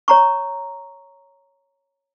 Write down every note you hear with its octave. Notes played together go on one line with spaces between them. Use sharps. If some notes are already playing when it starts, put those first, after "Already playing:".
C#5 A#5 C#6